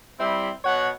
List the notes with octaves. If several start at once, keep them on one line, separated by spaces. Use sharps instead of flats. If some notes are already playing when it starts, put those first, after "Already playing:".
G3 C4 E4
B2 C#5 F#5